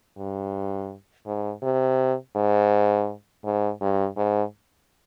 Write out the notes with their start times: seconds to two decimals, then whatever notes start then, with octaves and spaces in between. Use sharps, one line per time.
0.18 G2
1.26 G#2
1.63 C3
2.36 G#2
3.45 G#2
3.81 G2
4.17 G#2